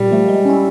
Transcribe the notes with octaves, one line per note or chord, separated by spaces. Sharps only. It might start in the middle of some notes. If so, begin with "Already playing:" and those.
Already playing: A#2 G3
F3 A3
G#3
C#4 E4